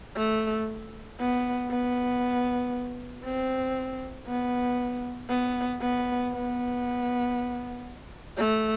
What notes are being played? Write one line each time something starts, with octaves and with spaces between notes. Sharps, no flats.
A3
B3
B3
C4
B3
B3
B3
B3
A3